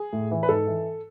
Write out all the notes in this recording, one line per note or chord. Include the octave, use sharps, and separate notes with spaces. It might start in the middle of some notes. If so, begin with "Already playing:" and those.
Already playing: G#4
A2
E3
B4
G#2 A4
E3